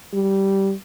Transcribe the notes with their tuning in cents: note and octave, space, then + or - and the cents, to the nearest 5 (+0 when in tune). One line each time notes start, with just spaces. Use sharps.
G3 -10